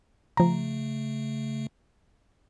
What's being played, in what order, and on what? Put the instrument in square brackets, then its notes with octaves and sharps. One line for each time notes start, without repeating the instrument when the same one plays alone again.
[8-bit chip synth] C#3 A3 [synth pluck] F3 A#5